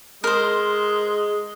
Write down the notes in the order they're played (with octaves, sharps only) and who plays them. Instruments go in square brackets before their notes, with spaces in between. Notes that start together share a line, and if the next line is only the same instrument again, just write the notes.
[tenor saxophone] G#3 [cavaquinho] A#4 C5